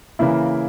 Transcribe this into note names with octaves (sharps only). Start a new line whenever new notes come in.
C#3 E3 A#3 E4